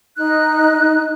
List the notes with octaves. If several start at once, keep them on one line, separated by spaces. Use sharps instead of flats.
D#4 F#6